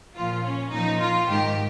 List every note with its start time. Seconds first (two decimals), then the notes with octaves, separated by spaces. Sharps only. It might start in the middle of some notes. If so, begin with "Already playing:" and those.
0.16 A#2 F3 F4
0.44 C#4
0.72 A#2 F3 D#4
1.01 F4
1.29 G#2 D#3 G4